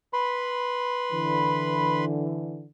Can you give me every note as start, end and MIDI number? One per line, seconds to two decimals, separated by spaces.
0.13 2.05 71
0.13 2.05 83
0.13 2.05 84
1.11 2.66 50
1.11 2.66 52